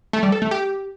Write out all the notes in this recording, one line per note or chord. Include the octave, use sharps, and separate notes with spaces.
A3
G3
A4
A3
G4